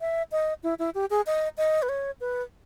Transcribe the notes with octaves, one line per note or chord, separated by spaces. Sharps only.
E5
D#5
E4
E4
G4
G#4
D#5
D#5
B4
C#5
B4